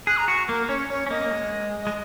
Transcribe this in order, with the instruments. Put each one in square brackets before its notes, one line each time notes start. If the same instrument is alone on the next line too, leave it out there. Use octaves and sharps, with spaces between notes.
[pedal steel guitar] G#4 [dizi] F#6
[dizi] A#5
[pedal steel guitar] F#4 [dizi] C#6
[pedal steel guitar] A#3 [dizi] A#4
[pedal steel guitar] C#4 [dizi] C#5
[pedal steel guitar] C#4 [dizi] C#5
[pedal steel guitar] C#4
[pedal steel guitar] A#3 [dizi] D#5
[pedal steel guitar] A#3
G#3
[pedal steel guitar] G#3 [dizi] D#5